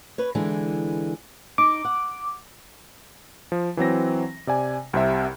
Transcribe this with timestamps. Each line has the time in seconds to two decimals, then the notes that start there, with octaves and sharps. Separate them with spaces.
0.18 B4 C#5
0.35 D3 E3 G#3
1.58 D#4 D6
1.85 F#5
3.52 F3
3.77 E3 F#3 C4 A#6
4.47 C3 D5 G#5
4.93 C2 C3 E5